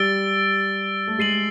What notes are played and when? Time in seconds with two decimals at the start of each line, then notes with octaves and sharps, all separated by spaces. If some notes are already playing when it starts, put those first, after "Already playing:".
Already playing: G3 E6 A6 D7 G7
1.07 A3
1.19 G#3 A6 C7 D#7 F#7